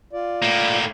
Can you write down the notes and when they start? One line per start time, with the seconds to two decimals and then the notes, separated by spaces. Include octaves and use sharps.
0.13 F4 D5
0.42 A2 A#3